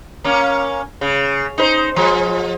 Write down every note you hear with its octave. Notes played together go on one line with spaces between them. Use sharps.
A#3 C#4
C#3
D#4 B4 C5
F3 G#3